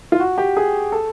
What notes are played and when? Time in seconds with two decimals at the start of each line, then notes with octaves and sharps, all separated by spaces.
0.12 F4
0.20 F#4
0.38 G4
0.57 G#4
0.92 A4